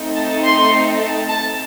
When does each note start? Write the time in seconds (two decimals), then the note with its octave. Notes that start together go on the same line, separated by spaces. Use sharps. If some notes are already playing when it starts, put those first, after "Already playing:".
Already playing: A3 C4 D#4
0.16 A5
0.45 C6
1.00 A5
1.29 A5